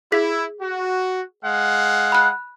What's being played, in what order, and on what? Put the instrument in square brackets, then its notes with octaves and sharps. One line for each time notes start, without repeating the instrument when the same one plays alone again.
[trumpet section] E4 [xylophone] G#4 B6
[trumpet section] F#4
G#3 F5 F#5
[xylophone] B5 F#6